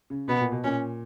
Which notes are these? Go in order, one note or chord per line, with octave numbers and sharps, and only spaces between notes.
C#3
B2 B3
A#2
B2
A#2 C#4